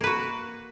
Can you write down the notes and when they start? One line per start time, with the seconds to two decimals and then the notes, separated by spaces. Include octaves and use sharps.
0.01 A#3
0.04 B4
0.07 F#4